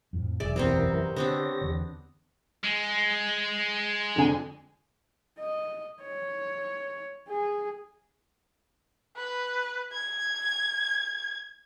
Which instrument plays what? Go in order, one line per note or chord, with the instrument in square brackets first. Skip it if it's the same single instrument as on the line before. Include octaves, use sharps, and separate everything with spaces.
[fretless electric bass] F2 A2 F3
[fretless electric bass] E1 B1 [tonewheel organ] G#4 E5 [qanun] D5
[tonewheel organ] F#2 E3 A#4 [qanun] C3 B3 C4
[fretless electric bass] D3 [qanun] B3 C4 D4 [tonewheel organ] G4 C#5 A#6
[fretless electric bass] E2 D3
[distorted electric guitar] G#3
[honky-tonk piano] F2 D3 G#5
[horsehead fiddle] D#5
C#5
G#4
[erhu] B4
G#6